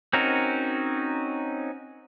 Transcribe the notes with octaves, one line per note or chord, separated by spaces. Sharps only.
C4 C#4 D#4 F#4 A#4